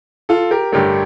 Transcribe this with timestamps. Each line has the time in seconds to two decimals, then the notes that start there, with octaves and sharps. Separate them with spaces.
0.29 F4 A4
0.51 G4 A#4
0.72 A1 G2 D3 A3 G4 A#4